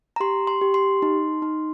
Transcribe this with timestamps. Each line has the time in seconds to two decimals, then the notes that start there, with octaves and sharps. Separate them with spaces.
0.16 A#5
0.20 G4 C6
0.47 C6
0.61 G4
0.74 C6
1.02 D#4
1.42 D#4